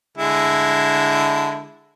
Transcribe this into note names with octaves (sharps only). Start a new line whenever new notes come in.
D3 G#3 E4